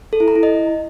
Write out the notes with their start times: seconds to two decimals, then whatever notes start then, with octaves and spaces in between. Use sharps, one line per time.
0.13 A4
0.20 E4
0.28 A#5
0.35 E4
0.43 D#5